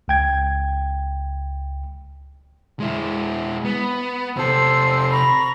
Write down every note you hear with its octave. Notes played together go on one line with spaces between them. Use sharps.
C#2 G5 G#6
G#3 E4
B3
C3 A4 C5 E6
A#5 B5 C#6